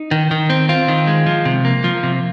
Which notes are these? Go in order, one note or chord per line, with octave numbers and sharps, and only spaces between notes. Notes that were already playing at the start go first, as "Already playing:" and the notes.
Already playing: D#4
D#3
D#3
C4
C4 F4
D#3
G#3
F3
C3
A#3
F3
C3